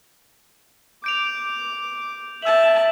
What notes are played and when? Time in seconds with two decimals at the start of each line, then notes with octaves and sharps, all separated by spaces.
1.04 D6 G6 D7 F7
2.42 E5 A5 E6 F#7